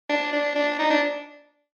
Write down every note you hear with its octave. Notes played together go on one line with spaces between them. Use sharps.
D4
D4
D4
D#4
D4